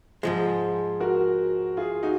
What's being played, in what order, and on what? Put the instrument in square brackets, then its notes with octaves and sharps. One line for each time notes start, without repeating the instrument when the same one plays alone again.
[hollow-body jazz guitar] G#2 F3 G#3 [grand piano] G#4 C5
[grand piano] F#4 A#4
F4 G#4
D#4 F#4